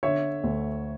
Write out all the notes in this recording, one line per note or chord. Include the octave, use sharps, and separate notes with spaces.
D3 C#5 E5
D2